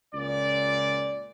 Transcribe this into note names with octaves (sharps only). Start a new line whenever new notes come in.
C#2 A#2 D5